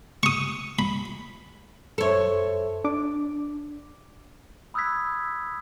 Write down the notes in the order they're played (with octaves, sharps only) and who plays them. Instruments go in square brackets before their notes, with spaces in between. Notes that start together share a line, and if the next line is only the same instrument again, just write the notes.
[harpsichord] C#6 D#6
B5
[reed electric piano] F#2 C5 E5 [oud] A4 C#5
[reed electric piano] D4 D6
[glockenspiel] B5 D#6 E6 F#6 G#6 B6